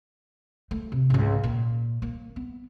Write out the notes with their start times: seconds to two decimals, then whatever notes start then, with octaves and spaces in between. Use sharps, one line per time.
0.71 A3
0.92 C3
1.10 C#2 G#2
1.43 A#2
2.02 A#3
2.36 B3